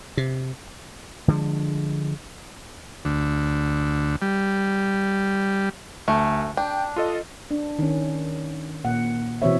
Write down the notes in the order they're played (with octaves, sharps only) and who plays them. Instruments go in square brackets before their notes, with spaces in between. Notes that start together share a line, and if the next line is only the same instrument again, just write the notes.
[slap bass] C3
D3 F3 G#3
[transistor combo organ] D2
G3
[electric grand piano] D2 [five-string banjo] A3
[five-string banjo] D4 [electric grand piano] G5
[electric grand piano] F4 A4 D#5
[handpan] D4
D#3 C#4
A#2 F#5
B2 E3 C4 C#5 E5